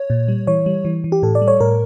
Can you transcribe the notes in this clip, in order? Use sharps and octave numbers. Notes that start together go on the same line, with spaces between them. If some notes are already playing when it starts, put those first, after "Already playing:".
Already playing: C#5
A#2
G3
E3 C#5
G3
E3
E3
G4
A2 A4
D5
G3
C#5
A2 A#4